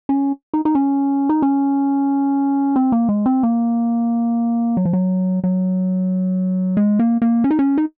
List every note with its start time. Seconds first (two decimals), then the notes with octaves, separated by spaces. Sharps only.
0.09 C#4
0.54 D#4
0.65 D#4
0.75 C#4
1.29 D#4
1.42 C#4
2.76 C4
2.92 A#3
3.09 G#3
3.26 C4
3.43 A#3
4.77 F#3
4.85 F3
4.93 F#3
5.44 F#3
6.77 G#3
6.99 A#3
7.22 A#3
7.44 C#4
7.51 D#4
7.59 C#4
7.78 D#4